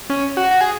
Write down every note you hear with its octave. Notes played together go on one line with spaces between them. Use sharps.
C#4
F#4
F#4
G#4